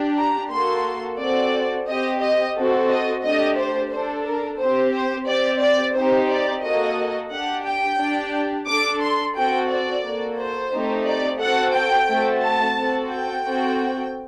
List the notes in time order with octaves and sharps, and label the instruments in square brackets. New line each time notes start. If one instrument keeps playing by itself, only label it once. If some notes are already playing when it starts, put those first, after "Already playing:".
Already playing: [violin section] D4 G4
A#5
A#3 F#4 A4 C6
C4 F#4 A4 D5
C4 G4 D#5
D#5
C4 F#4 A4
D#5
A3 D4 G4 D#5
C5
D4 A4 C5
A#4
C4 G4 C5
C5
C4 G4 D5
D5
C4 D#4 G4 C5
D5
A#3 F#4 A4 D#5
D4 G4 F#5
G5
D4 G4
D4 A4 D6
C6
C4 F#4 A4 G5
D5
A#3 F#4 A4
C5
A3 C4 D#4 G4
D5
C4 F#4 A4 F#5
G5
A3 C4 F#4 A4
A5
C4 F#4 A4
G5
C4 F#4 A4